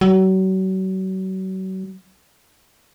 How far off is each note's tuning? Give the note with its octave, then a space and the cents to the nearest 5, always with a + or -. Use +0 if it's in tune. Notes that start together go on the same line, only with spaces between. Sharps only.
F#3 +35